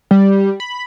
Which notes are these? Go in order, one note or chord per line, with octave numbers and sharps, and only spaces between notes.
G3
B5